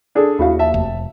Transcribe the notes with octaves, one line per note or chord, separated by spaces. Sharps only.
D4 G#4 A4
D#2 E4 F#4 F5
E5 A5
F1